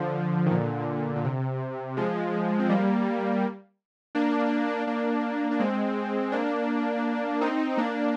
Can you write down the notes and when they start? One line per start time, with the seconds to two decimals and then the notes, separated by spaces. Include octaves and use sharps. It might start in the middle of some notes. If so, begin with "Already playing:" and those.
Already playing: D3 F3
0.46 D#3
0.51 A#2 D3
1.16 A#2
1.25 C3
1.97 F3 G#3
2.59 C4
2.69 G3 A#3
4.15 A#3 D4
4.87 A#3 D4
5.51 D4
5.60 G#3 C4
6.32 A#3 D4
7.41 C4 D#4
7.77 A#3 D4